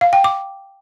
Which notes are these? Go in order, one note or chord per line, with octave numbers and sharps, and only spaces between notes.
F5
G5
D6